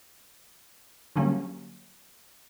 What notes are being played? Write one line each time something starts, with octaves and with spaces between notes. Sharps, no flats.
D3 F#3 G3 A#3 C#4